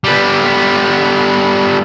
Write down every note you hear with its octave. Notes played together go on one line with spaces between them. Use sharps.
G3 B3